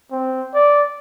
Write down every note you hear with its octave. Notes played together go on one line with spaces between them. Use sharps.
C4
D5